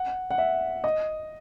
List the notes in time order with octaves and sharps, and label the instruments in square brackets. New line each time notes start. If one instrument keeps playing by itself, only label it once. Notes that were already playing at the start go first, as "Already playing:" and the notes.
Already playing: [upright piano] F#5
F#5
E5
D#5